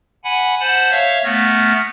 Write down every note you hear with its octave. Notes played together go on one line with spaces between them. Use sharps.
F#5 G#5 B5
C5 F#5 A5 B5
C#5 E5 F5
A3 B3 F6 A#6